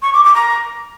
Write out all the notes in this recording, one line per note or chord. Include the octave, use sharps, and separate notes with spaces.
C#6
D6
D6
A#5